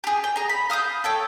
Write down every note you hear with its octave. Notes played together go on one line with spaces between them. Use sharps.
G4 G#4
G5
G#4 A#5
B5
F5 D#6 E6 G6
A4 C#5 G5